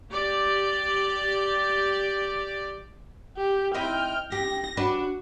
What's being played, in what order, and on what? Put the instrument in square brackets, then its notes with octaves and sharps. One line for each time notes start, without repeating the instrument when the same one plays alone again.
[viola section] G4 D5
[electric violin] G4
[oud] C4 D#4 E4 [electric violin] G5 F6
[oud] G4 [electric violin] A#6
[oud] D4 B4 [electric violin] F#4